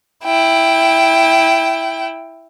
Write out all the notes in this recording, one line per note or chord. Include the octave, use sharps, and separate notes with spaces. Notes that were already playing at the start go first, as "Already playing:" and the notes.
E4 G5